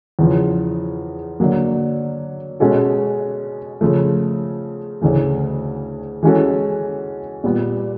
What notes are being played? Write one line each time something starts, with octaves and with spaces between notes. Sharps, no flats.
E2 C#3 F3
D3 F#3 A#3
B2 G#3 C#4 F#4 A4
C#3 F3 A3
D2 C#3 E3 A3
E3 G#3 C#4 F#4 A4
A#2 G3 B3